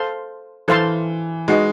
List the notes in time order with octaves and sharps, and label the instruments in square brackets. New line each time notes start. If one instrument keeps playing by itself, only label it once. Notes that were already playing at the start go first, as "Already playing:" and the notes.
Already playing: [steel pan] A4 C5 F5 A5 C6
[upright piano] E3 [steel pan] A4 C5 F5 A5 C6
[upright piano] G#3 [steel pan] D#4 F#4 B4 D#5